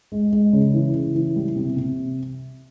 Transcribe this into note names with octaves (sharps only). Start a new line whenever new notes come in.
G#3
G#3
C#3
E3
C#3
E3
G3
C3
C3